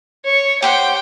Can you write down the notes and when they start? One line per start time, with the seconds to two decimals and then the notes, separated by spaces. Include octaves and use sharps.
0.25 C#5
0.62 G4 C5 F#5 G5